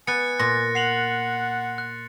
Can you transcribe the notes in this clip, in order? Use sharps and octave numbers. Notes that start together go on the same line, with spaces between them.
B3 G#5 F#6 A6 C#7
A#2 C6 A#6
F#5 C7 F7 F#7
F#6